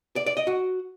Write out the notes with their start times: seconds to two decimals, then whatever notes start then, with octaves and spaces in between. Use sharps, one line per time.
0.16 D5
0.26 D5
0.37 D#5
0.47 F#4